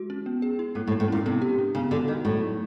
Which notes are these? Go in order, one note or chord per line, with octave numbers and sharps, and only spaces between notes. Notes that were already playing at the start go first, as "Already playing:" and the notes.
Already playing: G#3 E4 F#4
C#4
B3
G#4
E4
A2 A#3
A2
E4
A2
A#2 C#4
C3 B3
G4
D4
C#3 B3
D3 F#4
D#3 D#4
A2 F#3
D#4